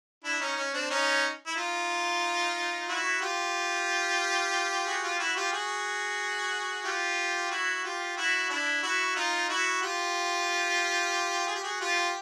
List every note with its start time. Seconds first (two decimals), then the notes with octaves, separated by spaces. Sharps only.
0.24 D4 E4
0.40 C#4 D#4
0.57 C#4
0.73 C4 D4
0.90 C#4 D#4
1.47 E4
1.56 D#4 F4
2.88 E4 F#4
3.21 F4 G4
4.86 F#4 G#4
5.03 F4 G4
5.19 E4 F#4
5.36 F4 G4
5.53 F#4 G#4
6.85 F4 G4
7.51 E4 F#4
7.84 F4 G4
8.17 E4 F#4
8.50 D4 E4
8.83 E4 F#4
9.16 D#4 F4
9.49 E4 F#4
9.82 F4 G4
11.47 G#4
11.55 G4
11.63 F#4 G#4
11.81 F4 G4